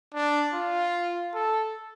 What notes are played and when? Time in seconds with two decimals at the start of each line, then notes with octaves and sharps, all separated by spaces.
0.14 D4
0.54 F4
1.34 A4